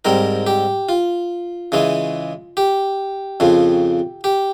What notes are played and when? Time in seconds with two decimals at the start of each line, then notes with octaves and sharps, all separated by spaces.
0.05 G#2 G3 C4 A#4
0.47 G4
0.89 F4
1.72 C#3 E3 G#3
2.57 G4
3.40 F2 C#3 F3
4.24 G4